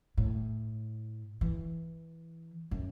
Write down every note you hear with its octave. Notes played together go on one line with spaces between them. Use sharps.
A2
E3
F#2